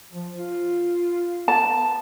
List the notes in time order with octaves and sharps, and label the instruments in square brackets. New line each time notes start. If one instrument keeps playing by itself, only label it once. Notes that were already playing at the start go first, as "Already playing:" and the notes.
[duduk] F3
F4
[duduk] B3 [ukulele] A5